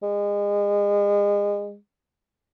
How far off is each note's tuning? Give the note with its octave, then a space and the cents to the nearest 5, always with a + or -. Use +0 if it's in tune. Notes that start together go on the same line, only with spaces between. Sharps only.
G#3 -30